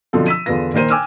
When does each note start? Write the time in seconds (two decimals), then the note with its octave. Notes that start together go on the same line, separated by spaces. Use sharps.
0.13 B2 D3 F3 F#3 C4 A4
0.27 E6 B6 D#7
0.46 E2 D3 F4 B4 A#6
0.73 A#2 D#3 A#4 C5 D#7
0.90 G5 G#5 D6 E6 F6